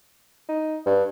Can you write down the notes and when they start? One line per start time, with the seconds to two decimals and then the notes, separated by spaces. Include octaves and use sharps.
0.49 D#4
0.86 G2